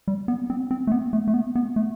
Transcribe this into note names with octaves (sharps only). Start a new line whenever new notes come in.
G3
B3
C4
C4
A3
B3
A3
A3
B3
B3
A3